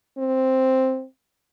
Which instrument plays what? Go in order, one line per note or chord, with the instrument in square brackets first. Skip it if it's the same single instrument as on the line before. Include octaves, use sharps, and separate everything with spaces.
[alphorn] C4